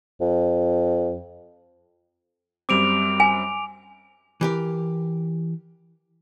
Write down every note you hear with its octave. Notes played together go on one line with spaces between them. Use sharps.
F2
F#2 G3 C4 D6 D7 F7
G#5
E3 G4 A#4